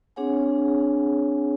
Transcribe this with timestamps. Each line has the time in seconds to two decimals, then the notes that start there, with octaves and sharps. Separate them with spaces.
0.16 C4 D4 G#4 C#5 F#5 G#5